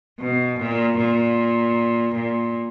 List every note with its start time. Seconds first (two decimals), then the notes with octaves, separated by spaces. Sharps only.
0.20 B2
0.59 A#2
0.97 A#2
2.15 A#2